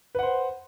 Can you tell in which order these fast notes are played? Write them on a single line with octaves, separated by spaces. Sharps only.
B4 F#5 C5